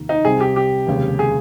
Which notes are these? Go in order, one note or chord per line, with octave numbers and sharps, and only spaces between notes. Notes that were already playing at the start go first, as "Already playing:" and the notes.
Already playing: F1 D#2 D#3
D#4
C2 C3 G3 C4 G#4
G4
G4
F1 D#2 C#3 G#3
G#4